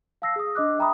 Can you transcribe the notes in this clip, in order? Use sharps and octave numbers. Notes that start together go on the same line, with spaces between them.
F5 A5 E6 A#6 C7
G#4 D#6
D4 D#5 D6 F#6
E5 G5 A#5 B5 D#6